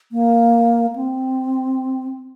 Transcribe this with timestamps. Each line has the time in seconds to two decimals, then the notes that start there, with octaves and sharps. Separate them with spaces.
0.12 A#3
0.96 C4